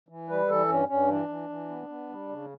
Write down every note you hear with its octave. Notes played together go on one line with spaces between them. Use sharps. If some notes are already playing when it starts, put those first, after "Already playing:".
E3
G3 B4
E3 A4
G2 C#4
G2 C#4
E3 D4
E3
E3
B3
B3
G3
C#3